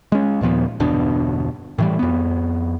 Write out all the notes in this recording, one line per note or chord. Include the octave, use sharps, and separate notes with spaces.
G#3 C#4
D#2 A#2 F3 B3
G1 E2 B2 D4
A2 E3 G3
F2 B3